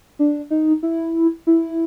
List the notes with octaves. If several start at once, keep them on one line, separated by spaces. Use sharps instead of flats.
D4
D#4
E4
E4